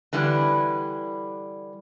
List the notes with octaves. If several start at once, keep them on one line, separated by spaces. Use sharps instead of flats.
D3 E3 G3 E4 B4